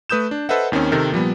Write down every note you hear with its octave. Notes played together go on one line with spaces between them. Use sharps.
A3 B4 D#6 G6 E7
D4
A4 B4 C5 D#5 E5 F#5
D#2 D#3 C4 C#4
C3 D#3 A4 A#4
A#2 F3 G3 B3